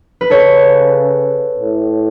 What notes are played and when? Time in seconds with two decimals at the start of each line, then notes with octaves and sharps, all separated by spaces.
0.21 B4
0.30 C#3 A4 C#5
1.59 A2